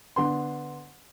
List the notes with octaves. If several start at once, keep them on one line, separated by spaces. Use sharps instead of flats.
D3 B3 C6